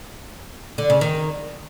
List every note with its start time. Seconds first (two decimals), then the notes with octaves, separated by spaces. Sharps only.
0.78 D3
0.90 C#3
1.01 D#3